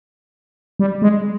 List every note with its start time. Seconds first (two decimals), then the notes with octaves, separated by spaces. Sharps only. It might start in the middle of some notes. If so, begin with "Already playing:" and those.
0.79 G3
1.02 G#3